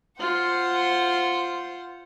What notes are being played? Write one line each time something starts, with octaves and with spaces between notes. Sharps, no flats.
F4 C5 F#5